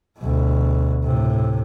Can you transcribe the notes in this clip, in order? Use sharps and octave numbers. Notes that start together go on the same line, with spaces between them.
D2 B2
A2 C3